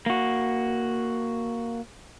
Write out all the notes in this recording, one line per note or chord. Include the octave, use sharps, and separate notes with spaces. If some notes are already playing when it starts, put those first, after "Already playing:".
A#3 F#4